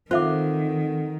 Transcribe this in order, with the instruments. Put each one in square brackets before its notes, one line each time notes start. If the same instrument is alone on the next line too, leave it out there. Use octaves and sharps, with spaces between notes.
[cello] D#3 [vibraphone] C4 A4 F#5 [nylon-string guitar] F4 [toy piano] C5 E5 D6